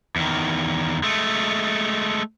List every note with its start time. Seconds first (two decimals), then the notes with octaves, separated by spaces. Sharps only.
0.16 E2 D#3
1.03 G#3 A3